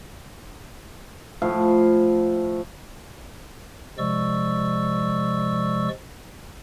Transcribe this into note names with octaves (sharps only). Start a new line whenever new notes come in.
A2 F3 F5
C3 F3 G#3 D5 C#6 E6